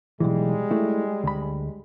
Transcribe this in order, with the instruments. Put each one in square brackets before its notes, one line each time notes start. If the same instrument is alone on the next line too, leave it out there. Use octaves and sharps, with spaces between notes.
[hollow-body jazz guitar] B1 E2 E3 [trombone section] G3 G#3
[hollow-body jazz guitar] A3 E4
D2 B5